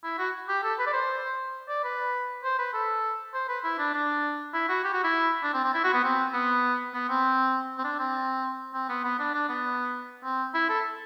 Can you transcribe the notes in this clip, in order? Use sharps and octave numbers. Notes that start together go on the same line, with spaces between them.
E4
F#4
G4
A4
B4
D5
C5
D5
B4
C5
B4
A4
C5
B4
E4
D4
D4
E4
F#4
G4
F#4
E4
D4
C4
C4
E4
F#4
B3
C4
B3
B3
C4
C4
D4
C4
C4
B3
B3
D4
D4
B3
C4
E4
A4